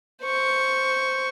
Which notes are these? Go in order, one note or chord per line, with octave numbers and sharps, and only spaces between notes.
C5 C#6